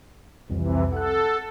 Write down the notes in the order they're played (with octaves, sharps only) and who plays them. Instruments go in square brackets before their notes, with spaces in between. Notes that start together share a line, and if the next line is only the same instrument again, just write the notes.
[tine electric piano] C2 F2 [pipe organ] C3 E3
[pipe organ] A4 [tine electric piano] F#5 F#6